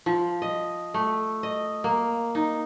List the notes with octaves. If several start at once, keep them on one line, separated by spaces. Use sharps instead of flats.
F3
D#5
A3
D#5
A#3
D#4